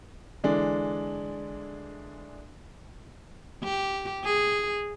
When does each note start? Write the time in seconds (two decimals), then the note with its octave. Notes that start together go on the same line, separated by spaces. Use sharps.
0.43 D3 E3 G#3 D4
3.64 G4
4.24 G#4